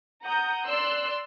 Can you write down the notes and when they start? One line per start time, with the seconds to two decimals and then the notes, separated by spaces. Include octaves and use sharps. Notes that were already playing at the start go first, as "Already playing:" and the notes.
0.24 F#5 A#5 D#6 G6
0.66 D5 C6 E6 F#6